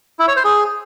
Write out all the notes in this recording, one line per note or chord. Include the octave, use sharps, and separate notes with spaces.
E4
C#5
C5
G#4